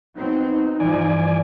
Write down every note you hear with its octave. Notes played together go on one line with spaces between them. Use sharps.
F#3 B3 C4 D#4
G2 E3 F3 D5 G#5